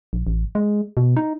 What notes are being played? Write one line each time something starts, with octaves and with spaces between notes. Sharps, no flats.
A#1
A1
G#3
B2
D#4